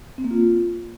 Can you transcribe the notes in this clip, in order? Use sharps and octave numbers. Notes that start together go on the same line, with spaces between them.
C4
A#3
F4